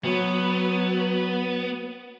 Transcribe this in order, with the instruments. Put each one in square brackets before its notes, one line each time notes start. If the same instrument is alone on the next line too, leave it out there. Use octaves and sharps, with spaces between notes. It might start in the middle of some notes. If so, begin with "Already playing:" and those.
[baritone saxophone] F#3 [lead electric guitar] B3